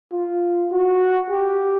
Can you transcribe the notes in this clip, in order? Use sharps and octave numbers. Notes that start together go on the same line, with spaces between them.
F4
F#4
G4